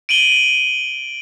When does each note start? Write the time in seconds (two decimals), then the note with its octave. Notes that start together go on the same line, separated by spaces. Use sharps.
0.09 D7 D#7 F#7 G7